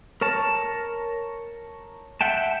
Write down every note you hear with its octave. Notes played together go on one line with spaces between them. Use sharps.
A#4 C#5 A5
E5 F#5 G5 A5